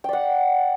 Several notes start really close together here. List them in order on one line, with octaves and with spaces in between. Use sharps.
G5 D5 F#5